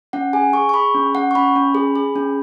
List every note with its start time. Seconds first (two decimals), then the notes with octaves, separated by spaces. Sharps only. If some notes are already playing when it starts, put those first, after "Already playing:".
0.13 C#4 F#5
0.33 G#4 G#5
0.53 G#4 C#6
0.69 C#6
0.74 G#4 B5
0.95 C#4
1.15 C#4 F#5
1.31 C#6
1.35 C#4 B5
1.56 C#4
1.75 G#4
1.96 G#4
2.16 C#4